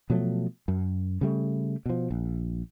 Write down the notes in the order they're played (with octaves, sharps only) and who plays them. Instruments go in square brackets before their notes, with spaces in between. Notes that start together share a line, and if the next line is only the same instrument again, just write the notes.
[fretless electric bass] B2 F3 F#3 A3
F#2
C#3 G3 A3
B2 F3
A#1